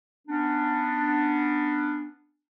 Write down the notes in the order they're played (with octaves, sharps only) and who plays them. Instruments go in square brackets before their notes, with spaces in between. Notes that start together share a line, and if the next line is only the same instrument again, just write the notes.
[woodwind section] B3 C#4 D4